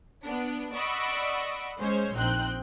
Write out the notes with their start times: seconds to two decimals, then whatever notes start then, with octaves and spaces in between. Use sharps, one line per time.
0.23 B3 D4
0.74 D5 D#5 F#5 B5 C#6 E6
1.78 G#3 C#4 C5 C#5
2.15 A#1 C4 D#4 G5 F#6